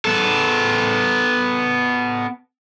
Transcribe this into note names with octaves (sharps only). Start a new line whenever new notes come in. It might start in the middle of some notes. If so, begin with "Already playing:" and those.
B3 A4